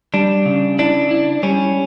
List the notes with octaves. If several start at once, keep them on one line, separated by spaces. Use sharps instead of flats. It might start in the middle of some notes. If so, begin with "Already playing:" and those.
G3 D4
C#3
D4 E4
E4
G3 C#4